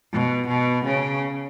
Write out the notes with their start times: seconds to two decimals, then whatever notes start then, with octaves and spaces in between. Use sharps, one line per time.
0.12 B2
0.48 B2
0.85 C#3